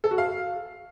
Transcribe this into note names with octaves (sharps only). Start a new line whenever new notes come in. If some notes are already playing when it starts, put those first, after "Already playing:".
A4
F#4
F5